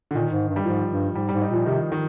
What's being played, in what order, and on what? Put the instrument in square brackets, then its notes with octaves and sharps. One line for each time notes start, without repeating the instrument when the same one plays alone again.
[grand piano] D3
[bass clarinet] A#2 [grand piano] D#3
[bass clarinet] G#2
G2
[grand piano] G3
[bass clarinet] G#2 [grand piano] F3
[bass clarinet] G2
[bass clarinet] G#2 [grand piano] G3
[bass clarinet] G#2 [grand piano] G3
[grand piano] D#4
[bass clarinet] A#2 [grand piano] F3
[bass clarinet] C3 [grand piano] D#3
[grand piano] D#3